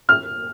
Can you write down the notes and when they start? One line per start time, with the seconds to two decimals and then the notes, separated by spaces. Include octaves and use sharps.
0.09 F6